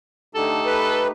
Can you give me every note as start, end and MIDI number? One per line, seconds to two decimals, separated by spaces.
0.35 0.60 50
0.35 1.11 57
0.35 1.11 63
0.35 1.11 67
0.35 1.04 69
0.66 1.07 71